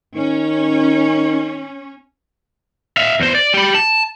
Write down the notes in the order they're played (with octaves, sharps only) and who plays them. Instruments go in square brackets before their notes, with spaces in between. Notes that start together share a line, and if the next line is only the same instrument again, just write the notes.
[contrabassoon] D#3 [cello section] C#4
[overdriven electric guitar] E5 F5
E2 C5
D5
G4 B5
A5